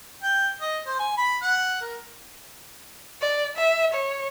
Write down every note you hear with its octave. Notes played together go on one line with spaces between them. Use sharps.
G5
D#5
C5
G#5
B5
F#5
A#4
D5
E5
C#5